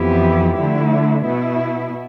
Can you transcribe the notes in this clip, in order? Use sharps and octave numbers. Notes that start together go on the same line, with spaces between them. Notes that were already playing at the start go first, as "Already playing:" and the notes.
Already playing: F2 E3 B3 E4 G4
D3 F3 A3 E4
B2 B3 E4